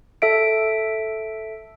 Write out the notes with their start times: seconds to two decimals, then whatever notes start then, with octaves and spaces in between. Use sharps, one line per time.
0.22 A4 E5 D7